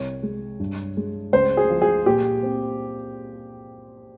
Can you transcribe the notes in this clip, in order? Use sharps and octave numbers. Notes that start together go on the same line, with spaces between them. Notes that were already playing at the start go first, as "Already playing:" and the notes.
Already playing: C2 C#5
G#3
G2
G#3
C#2 C5
G#4
F3
G#4
A#2 G4
C4